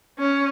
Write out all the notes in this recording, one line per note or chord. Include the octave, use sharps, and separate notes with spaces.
C#4